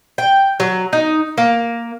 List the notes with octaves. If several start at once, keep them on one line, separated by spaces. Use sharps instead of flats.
G5
F#3
D#4
A#3